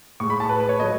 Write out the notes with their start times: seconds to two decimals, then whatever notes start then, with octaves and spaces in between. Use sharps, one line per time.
0.20 A2 G#3 C#6
0.30 B5
0.40 A5
0.49 B4
0.60 B4
0.69 C#5
0.80 A2 F#3 A3 D#5